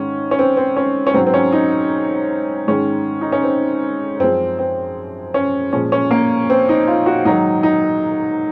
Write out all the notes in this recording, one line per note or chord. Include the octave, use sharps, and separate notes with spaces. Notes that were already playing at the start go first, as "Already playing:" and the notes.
Already playing: G#2 D#3 G#3 C#4
C#4
C4
C4
C#4
C#4
G#2 F#3 C4
C4
C#4
D#4
G#2 D#3 G#3 C#4
D#4
C#4
C4
F#2 F3 G#3 C4
C4
C#4
A#2 F3 G#3 C#4
C#4
A#3
C4
D#4
F4
F#4
G#2 D#3 F#3 D#4
D#4